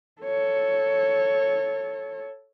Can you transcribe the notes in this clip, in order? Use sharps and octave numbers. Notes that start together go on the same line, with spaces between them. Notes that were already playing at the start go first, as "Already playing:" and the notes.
A4 C#5